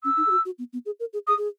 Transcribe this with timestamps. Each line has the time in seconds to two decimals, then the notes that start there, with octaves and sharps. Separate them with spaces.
0.04 C#4 E6
0.17 D#4
0.27 G#4
0.31 F#4
0.45 F#4
0.58 B3
0.73 B3
0.86 G#4
1.00 A#4
1.13 G#4
1.27 G#4 D#6
1.38 G#4